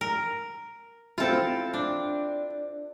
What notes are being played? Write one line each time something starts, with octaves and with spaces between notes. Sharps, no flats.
A#4
C4 E4 F4 A4
D4